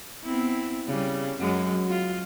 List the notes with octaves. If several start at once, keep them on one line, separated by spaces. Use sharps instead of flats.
B3 C4 E4
C#3 G3
F#2 F#3 G#3
F4 F#4